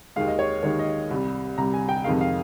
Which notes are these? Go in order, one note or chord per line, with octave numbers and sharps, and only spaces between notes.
D#2 D#3 G#3 F5
D#5
C#5
D#2 D#3 G#3 C#5
D#5
C2 C3 G3
C2 C3 G3 A#5
G#5
G5
F2 C3 D#3 G#3 F5
F5